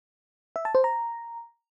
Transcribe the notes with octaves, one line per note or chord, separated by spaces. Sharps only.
E5
A5
C5
A#5